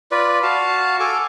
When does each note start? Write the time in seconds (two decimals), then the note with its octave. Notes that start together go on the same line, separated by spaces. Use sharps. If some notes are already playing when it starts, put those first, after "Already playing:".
0.11 F4 B4 D5
0.43 F#4 F5 A5
1.00 A4 G#5 D6